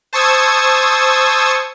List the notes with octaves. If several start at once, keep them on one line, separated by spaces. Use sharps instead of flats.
C5 A5 C#6 D#6 E6 G#6